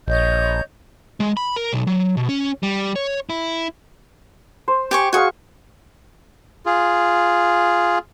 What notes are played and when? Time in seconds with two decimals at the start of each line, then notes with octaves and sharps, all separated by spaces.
0.08 A#1 C#5 D#5 G6
1.20 G#3
1.37 B5
1.56 A#4
1.73 B1
1.87 F#3
2.17 B2
2.29 C#4
2.63 G3
2.96 C#5
3.30 E4
4.68 C5
4.91 G4 G#5 C#6
5.13 F#4 G#4 F5 G#5 C#6
6.66 F4 G#4